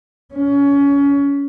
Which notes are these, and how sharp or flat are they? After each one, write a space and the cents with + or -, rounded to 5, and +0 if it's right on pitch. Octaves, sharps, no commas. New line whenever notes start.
C#4 +25